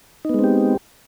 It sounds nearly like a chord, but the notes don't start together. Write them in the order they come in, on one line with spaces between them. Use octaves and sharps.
D#4 B3 G#3 C4 G4